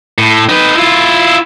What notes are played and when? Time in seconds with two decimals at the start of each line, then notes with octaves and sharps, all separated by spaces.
0.18 A2
0.49 D#4 B4
0.76 E4 F4